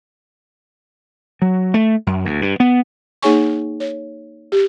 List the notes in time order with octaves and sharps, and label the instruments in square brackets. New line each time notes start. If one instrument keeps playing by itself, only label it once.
[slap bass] F#3
A3
F#2
D2
G2
B3
[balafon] A#3 D#4 G#4 C#5 G#5 C#6
C#5
G4